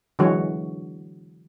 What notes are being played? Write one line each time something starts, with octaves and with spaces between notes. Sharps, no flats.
D3 E3 F#3 G#3 F#4 C#5